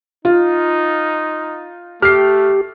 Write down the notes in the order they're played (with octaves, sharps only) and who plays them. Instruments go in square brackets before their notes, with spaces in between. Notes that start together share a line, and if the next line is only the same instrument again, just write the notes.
[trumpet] D#4 [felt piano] F4
[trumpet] A3 [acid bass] G4 [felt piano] F6 C7